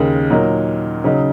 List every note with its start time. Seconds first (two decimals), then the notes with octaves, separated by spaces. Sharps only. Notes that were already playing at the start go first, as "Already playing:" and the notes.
Already playing: D#2 C#3 G#3 D#4 A#4
0.30 A#2 F#3 D#4 A#4
1.04 C#3 F#3 D#4